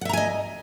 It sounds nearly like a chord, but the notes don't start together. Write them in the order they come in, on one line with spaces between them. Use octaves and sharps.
F#5 E5 A#5 G#5 D#5